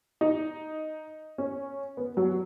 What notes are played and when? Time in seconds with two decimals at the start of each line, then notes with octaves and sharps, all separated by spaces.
0.21 D#4
1.38 C#4
1.97 B3
2.17 F#3